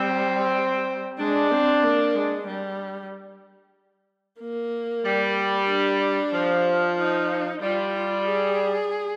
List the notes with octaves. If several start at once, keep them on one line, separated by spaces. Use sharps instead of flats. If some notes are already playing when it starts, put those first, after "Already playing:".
Already playing: G3 C4
G#3 D4
C4
A#3
G#3
G3
A#3
G3
D4
F3
D#4
G3 F4
F4
G#4